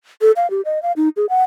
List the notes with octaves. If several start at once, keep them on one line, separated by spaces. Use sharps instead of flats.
A4
F5
G4
D#5
F5
D#4
G#4
F#5